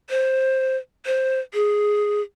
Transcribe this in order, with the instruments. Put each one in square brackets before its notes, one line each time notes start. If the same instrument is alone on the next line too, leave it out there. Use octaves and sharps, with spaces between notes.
[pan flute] C5
C5
G#4